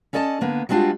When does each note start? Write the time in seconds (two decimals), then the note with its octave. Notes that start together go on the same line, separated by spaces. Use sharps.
0.13 C#4 A4 D5 D#5 A5
0.41 D3 A#3 B3
0.69 G3 G#3 C4 D4 F4 F#4